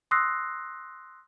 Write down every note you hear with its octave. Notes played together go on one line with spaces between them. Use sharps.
C6 D#6 E6 F#6 A#6 C7